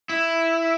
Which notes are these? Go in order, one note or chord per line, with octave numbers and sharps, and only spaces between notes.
E4